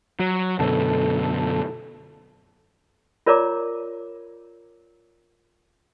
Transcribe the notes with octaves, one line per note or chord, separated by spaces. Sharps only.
F#3
F#2 B2 D3 A4
F4 A#4 C#5 D5 A#5 D6